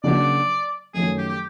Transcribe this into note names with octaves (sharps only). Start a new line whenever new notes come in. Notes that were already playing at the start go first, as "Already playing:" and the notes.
C#3 F#3 A#3 D4 F#4 D5
F#2 D#3 F#3 A3 C#4 G#4
G4
G4